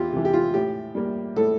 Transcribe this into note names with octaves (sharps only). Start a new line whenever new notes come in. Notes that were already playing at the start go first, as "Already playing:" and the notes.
Already playing: E2 E4 F4 G4
C3 E3
G4
F4
A2 G4
G3 A#3
A2 A4